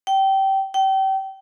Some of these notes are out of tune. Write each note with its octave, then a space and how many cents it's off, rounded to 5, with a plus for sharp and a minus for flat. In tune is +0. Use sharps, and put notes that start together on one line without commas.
G5 -20
G5 -30